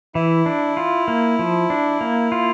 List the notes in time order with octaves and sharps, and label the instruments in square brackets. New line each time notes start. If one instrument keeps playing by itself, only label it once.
[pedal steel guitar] E3 [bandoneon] E4
[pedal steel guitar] D4
F4
A#3
F3
D4
A#3
F4